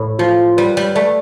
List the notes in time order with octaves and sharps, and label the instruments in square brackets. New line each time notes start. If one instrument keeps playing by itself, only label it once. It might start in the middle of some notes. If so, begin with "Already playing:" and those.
Already playing: [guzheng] A2
[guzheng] F3 [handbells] F4
[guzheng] G3 [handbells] B4
[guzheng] G3
[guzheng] A3 [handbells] D5